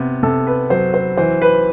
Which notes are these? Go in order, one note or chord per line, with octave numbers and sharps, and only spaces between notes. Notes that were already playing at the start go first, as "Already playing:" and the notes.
Already playing: C3 B3
C3 A4
B4
F#3 C5
C5
E3 C5
B4